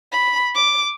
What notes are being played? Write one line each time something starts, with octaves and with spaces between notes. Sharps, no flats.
B5
D6